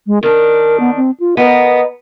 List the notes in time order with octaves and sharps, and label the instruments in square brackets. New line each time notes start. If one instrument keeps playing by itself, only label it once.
[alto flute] G#3
[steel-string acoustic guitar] D#3 D4 [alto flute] A#4
[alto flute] B3
C4
F4
[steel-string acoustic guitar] B3 A#4 [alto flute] D#5